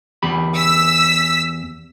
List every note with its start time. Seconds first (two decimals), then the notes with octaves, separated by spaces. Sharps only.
0.23 E2 G4 B5
0.55 E6 B6